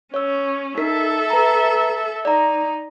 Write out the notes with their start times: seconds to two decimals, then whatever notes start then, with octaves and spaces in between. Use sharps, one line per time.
0.14 C#4 C#5 E6
0.77 D#4 A4 A#4 E5 B6
1.30 B4 A#5
2.25 D#4 D5 A#5